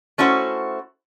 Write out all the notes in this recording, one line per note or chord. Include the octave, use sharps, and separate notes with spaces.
A3 C#4 E4 F#4 C5